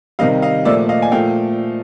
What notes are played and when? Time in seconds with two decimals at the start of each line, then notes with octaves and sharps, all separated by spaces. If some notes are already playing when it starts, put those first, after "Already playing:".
0.19 C3 D#3 G3 D#5 F5
0.42 D#5 F5
0.65 A#2 F3 A3 D5 E5
0.89 D#5 F5
1.02 G#5
1.12 A#2 F3 A3 F5 G5